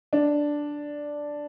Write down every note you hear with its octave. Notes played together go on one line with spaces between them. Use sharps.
D4